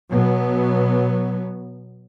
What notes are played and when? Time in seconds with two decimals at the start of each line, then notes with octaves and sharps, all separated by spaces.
0.11 B2 F#3 B3